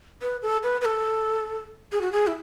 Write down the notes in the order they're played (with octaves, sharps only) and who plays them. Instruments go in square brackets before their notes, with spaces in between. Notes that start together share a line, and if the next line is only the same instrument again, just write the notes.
[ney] B4
A4
B4
B4
A4
G#4
F#4
G#4
E4